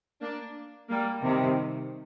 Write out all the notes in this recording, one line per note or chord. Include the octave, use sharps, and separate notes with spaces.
A#3 D4
G3 A#3
C3 D#3